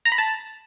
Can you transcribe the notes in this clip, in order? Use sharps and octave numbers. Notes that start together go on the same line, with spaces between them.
A#5
B5
A5